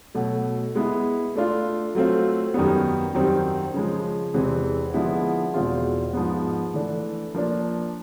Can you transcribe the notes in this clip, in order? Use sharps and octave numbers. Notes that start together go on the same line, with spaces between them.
B2 F#3 A3
G#3 B3 E4
A3 D4 F4
F#3 A3 C4 F4
F#2 D#3 G3 B3
F#2 D#3 G3 C4
C#3 F3 G#3
E2 C3 E3 G#3 C4
D3 F3 G#3 B3 E4
E2 B2 G#3 C4 F4
G#2 F3 G#3 B3
E3 A3 D4
F3 A#3 D4